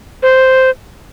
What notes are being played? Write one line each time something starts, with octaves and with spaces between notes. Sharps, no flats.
C5